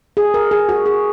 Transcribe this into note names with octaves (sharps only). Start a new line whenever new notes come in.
G#4
A#4
G#4
F#4
G#4